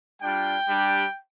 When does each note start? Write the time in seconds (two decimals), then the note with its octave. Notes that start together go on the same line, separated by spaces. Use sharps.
0.21 G3 D4 F4 G5
0.68 G3 D4 G4